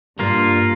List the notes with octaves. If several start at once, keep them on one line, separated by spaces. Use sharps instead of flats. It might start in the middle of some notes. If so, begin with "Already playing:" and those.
G2 A#3 F4 A#4